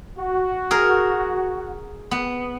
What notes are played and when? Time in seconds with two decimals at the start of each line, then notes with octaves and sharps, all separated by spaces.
0.18 F#4
0.71 G#4 A#4
2.11 B3